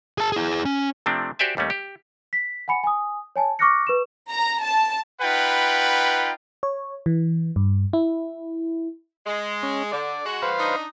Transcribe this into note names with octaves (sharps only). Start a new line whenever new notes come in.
G#4 A5
E4 G#4
C#4
C3 F3 A3 C4 D4
F#4 G4 C5 D5 E5 G#5
D#2 G3 A3 C#4
G4
B6
F#5 G#5 B5 C#7
G#5 D#6
C#5 G#5 A5
C#6 D6 F6 F#6 A#6 C#7
B4 C#6 E7
A#5
A5
D#4 F4 B4 F#5 G5 B5
C#5
E3
G2
E4
G#3
C#4
D3 D5
G#3 F#4
B4 C5 F5
D4 D#4